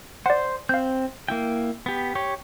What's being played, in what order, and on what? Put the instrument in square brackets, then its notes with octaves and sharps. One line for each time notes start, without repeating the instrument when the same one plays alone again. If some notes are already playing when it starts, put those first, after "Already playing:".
[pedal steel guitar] C5 [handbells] D5 F#5
[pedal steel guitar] C4 [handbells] F5 G6
[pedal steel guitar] A#3 E4 G5
B3 G4
G4 C#5 G5